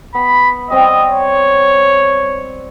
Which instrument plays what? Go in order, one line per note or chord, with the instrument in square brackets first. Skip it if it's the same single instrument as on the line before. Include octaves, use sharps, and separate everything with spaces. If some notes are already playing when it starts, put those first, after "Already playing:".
[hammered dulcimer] B3 [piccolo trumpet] B5
[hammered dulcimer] G3 C4 [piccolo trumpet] D#5
[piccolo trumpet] C#5